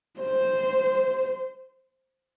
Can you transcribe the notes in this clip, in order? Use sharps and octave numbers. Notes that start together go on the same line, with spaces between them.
C5